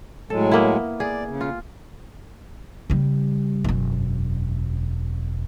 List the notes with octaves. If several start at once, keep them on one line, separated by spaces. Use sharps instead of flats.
A2 F#3 G#3 A4
A#3 B3 E4
G#4 D5
C#3
F4
C#3 G3
E1 F#2